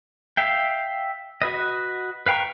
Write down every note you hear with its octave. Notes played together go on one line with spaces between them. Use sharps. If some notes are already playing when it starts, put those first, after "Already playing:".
E5 F5 G5
F#4 B4 D#5
B4 F5 G5 A#5 C#6